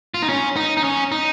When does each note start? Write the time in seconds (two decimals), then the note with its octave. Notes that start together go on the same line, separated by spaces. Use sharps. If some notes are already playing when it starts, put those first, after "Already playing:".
0.14 F4
0.22 D#4
0.29 C#4
0.56 D#4
0.77 D#4
0.84 C#4
1.12 D#4